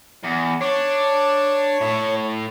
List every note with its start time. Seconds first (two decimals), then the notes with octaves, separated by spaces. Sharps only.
0.23 E2
0.61 D4 C#5
1.81 A2